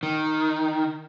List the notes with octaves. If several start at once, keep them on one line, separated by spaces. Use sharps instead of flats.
D#3